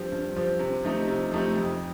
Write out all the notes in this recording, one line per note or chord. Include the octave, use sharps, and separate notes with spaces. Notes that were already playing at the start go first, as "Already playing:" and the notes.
Already playing: G2 F3 C4 G4
G2
F3 C4 G4
C3
F3 A3 D#4 G4
C3
F3 A3 D#4 G4
F2